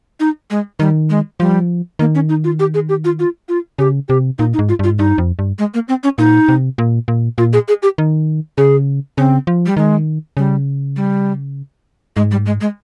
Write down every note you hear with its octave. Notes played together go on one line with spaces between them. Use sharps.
D#4
G#3
D#3 G3
G#3
F3 G3
D#3 A#3
C#4
D#4
F4
G4
G#4
G4
F4
F4
F4
C#3 G4
C3 G4
A#2 D#4
D#4
G#2
F4
G2 F4
G#2
G2 D#4
F2
G2
G#3
A#3
C4
C#4
A#2 D#4
C3
A#2
A#2
A#2 F4
G#4
G#4
G4
D#3
C#3 G#4
C#3 C4
F3
G3
D#3 G#3
C#3 G3
G3
G#2 G#3
G3
G#3
G#3